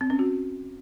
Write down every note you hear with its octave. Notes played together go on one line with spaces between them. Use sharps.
C4
C#4
F#4